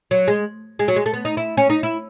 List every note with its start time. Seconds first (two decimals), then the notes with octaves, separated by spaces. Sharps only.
0.11 F#3
0.28 G#3
0.79 G#3
0.88 F#3
0.96 G#3
1.06 A3
1.13 B3
1.25 D#4
1.37 E4
1.57 C#4
1.70 D#4
1.83 E4